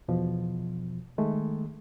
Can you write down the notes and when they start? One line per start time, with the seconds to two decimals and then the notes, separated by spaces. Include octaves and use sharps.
0.08 E2 B2 F3
1.18 D#3 G#3 A3